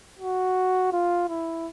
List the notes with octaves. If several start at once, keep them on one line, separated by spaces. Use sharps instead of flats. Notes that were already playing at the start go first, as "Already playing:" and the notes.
F#4
F4
E4